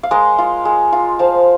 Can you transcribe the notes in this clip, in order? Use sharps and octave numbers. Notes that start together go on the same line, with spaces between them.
F5
G#3 A#4 D#5
F4
G#3
F4
F3 C5 F5